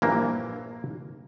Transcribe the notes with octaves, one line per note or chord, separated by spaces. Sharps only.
A#1 G2 E3 A#3